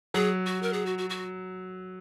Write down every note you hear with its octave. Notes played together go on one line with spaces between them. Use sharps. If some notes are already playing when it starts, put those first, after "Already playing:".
F#3 G#4
F#4
A#4
G#4
F#4
F#4
F#4